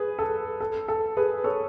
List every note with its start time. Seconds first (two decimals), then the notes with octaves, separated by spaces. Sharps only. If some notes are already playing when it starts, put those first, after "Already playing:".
Already playing: G#4 B4
0.19 A4
0.60 A4
0.88 A4
1.17 G#4 B4
1.44 A4 C#5